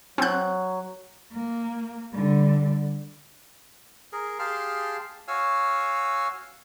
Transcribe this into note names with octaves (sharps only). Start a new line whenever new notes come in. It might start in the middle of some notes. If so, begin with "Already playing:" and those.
F#3 C4 F#6
A#3
D3 G3
G#4 A#4
G4 G#4 F5 A5 C6 F6
F#4 C#5 F5 G#5 E6 F6